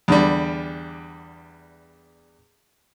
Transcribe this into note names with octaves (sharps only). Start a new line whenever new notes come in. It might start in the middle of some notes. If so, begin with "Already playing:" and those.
E2 D3 G3